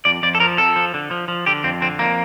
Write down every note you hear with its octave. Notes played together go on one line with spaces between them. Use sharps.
F2 D5
F2 D5
A4
F3 A#4
F2 A4
F3
D3
F3
F3
D3 G4
F2 C4
D3 C4
F2 A#3